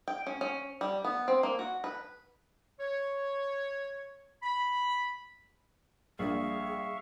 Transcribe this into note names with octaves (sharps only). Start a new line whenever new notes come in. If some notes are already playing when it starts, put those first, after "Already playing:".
G5
C#4
C#4
G3
B3
C4
A#3
F#4
B4
C#5
B5
A#1 G3 G#4 E5 F5 C#6